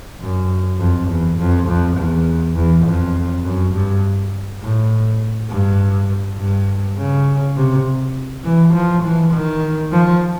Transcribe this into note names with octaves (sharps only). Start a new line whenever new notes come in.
F#2
F2
E2
F2
F2
E2
E2
F2
F#2
G2
A2
G2
G2
C#3
C3
E3
F3
E3
D#3
F3